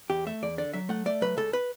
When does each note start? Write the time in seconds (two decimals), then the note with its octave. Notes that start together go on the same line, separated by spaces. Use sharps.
0.10 E2 G4
0.27 A3 E5
0.42 E2 D5
0.58 D3 D5
0.73 F#3 E5
0.89 A3 F#5
1.06 A3 D5
1.21 F#3 B4
1.37 C#2 A4
1.53 B4